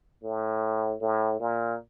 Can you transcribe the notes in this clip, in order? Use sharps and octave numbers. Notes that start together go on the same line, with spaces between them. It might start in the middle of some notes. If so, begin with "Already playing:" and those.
A2
A2
A#2